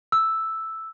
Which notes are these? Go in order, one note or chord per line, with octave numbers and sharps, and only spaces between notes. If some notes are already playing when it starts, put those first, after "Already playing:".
E6